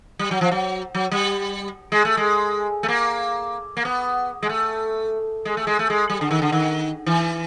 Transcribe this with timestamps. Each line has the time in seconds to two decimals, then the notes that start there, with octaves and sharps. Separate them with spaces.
0.19 G3
0.31 F#3
0.41 F3
0.51 F#3
0.95 F#3
1.11 G3
1.92 G#3
2.05 A3
2.17 G#3
2.83 A3
2.88 A#3
3.77 A#3
3.85 B3
4.43 G#3
4.49 A3
5.45 G#3
5.57 A3
5.67 G#3
5.79 A3
5.90 G#3
6.10 G3
6.21 D3
6.31 D#3
6.42 D3
6.52 D#3
7.06 E3